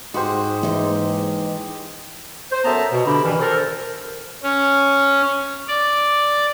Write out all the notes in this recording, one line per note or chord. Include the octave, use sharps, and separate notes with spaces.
G#2 G#3 F#4 G4 C5
D#2 E3 D#4
C5
F#2 B3 A4 E5 A5 A#5
B2
B2 D3 D4 G4 B5
G2 B2 D#3 E3
A4 A#4 C5
C#4
D5